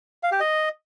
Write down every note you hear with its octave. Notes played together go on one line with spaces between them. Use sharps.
F5
G4
D#5